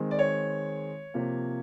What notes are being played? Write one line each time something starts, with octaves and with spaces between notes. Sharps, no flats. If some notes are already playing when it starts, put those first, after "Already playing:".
Already playing: D#3 G#3 C4
D5
C#5
C3 F3 A#3